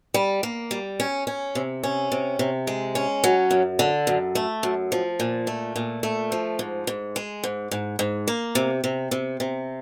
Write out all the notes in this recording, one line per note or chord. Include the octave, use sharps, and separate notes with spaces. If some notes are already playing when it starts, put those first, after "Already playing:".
G3
A#3
G3
C#4
C#4
C3
C#4
C3
C3
G#3
C#4
F#3
F#2
D3
F#2
A3
F#2
F3
A#2
A3
A#2
A3
F3
G#2
G#2
G#3
G#2
G#2
G#2
A#3
C3
C3
C3
C3